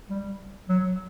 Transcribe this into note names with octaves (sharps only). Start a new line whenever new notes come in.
G3
F#3